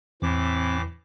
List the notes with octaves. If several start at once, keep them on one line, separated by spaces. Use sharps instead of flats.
E2 A2 E3 C4 D6